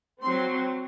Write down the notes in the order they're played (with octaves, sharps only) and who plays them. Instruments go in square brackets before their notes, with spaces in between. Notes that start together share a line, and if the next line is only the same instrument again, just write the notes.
[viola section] F#3 C4 C6